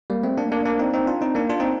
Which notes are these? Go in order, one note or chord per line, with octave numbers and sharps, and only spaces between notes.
G3 A#3
A3 C4
A#3 D4
A#3 D4
A#3 D4
C4 D#4
C4 D#4
D4 F4
C4 D#4
A#3 D4
D4 F4
C4 D#4